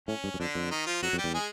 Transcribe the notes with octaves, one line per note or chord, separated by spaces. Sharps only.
A2 C#4
G2
F#2
F2 D3 D4
F2
D#3 D#4
F3 F4
F2 F#3 F#4
F2
G3 G4
E2
G#3 G#4